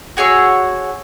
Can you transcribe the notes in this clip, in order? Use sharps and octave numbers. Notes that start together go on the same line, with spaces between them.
F#4 G#4 C#5 E6